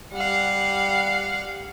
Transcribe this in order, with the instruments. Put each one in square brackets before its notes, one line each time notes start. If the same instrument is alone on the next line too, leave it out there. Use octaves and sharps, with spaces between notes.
[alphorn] G3 [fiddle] F5 F#5